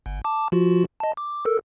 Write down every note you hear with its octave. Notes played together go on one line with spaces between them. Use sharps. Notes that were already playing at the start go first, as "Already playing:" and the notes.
G1
A5 D6
F3 F4 F#4
D#5 A5
D6
A4 A#4 E6